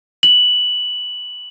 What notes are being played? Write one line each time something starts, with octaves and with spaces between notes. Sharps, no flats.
F#7